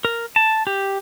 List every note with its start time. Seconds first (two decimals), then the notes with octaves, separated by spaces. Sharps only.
0.05 A#4
0.36 A5
0.67 G4